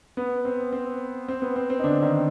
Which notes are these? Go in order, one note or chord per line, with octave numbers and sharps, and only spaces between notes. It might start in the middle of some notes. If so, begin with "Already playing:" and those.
B3
C4
C4
C4
B3
C4
C4
D#4
D3 D4
D4
D#3 D#4